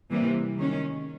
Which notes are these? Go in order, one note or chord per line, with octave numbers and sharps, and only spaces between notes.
C3 E3 G3 A#3
D#3 G#3 C#4